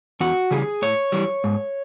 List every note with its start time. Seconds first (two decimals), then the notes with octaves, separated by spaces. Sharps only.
0.20 E2 F#4
0.51 C#3 E3 G3 G#4
0.82 A2 C#5
1.12 E3 G3
1.44 G#2